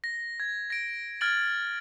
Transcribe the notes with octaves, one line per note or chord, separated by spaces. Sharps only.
A#6
G#6
A#6 D7
F6 G#6 A6 D7 F#7